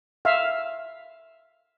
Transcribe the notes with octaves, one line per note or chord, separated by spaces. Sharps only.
E5 F5